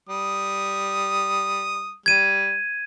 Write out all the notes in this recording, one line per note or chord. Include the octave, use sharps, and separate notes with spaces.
G3 D#6
G3 G#6 D#7